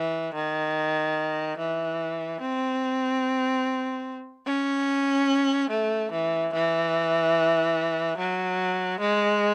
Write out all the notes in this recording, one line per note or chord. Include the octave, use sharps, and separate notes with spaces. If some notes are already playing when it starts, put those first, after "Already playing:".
Already playing: E3
D#3
E3
C4
C#4
A3
E3
E3
F#3
G#3